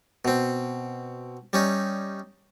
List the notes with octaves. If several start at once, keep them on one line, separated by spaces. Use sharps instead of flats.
B2 C4
G3 C#4 D#4